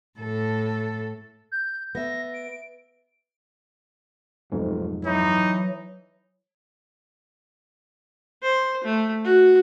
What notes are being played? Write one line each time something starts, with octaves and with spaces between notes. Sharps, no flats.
A2 A4
G6
B3 E5 A#6
D7
F1 B1 F2 G#2
E3 F#3 D#4
C5
A3
F#4